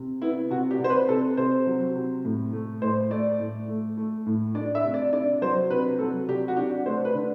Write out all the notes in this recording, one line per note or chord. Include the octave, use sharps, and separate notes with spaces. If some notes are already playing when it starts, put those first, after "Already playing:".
Already playing: C3
B3 E4
C3 F#4
G4
C3 C5
B4
C3 A4
C3 C5
F#3
C3
A2
A3
A2 C5
A3 D5
A2
A3
A3
A2
D4 D5
E5
C3
D5
D4 D5
F#3 C5
C3 B4
F#3 A4
C3 G4
F#4
D4 G4
A3 C5
B4
D3